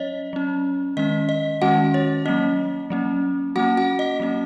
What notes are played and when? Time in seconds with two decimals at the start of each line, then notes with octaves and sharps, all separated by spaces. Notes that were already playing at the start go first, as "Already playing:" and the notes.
Already playing: F#3 C#4 C#5 D#5
0.33 F#3 C#4
0.97 D#3 G#3 C#4 D#5
1.29 D#5
1.62 D#3 G#3 C#4 F#4 F#5
1.94 C#5
2.26 F#3 A#3 C#4 D#5
2.90 F#3 A#3 C#4
3.56 F#3 A#3 C#4 F#4 F#5
3.77 F#4 F#5
3.99 D#5
4.20 F#3 A#3 C#4